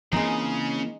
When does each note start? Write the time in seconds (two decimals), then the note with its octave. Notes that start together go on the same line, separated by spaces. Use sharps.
0.13 C#3 E3 G#3 A#3 C4 D#4